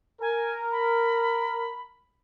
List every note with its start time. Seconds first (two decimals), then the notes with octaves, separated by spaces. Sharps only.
0.21 A#4 G#5
0.72 B5